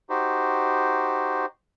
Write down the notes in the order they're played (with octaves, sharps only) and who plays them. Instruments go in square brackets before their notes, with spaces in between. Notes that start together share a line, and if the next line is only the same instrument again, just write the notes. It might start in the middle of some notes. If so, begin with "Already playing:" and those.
[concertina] D#4 F#4 G4 C5